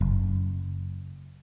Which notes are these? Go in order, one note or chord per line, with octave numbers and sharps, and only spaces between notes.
F#1